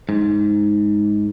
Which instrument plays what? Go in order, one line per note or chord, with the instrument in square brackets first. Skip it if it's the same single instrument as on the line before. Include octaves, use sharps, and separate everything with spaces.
[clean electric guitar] G#2